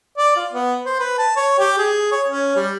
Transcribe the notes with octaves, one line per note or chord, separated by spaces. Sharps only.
D5
F4
B3
C5
B4
A5
C#5
G4
G#4
C#5
C#4
G3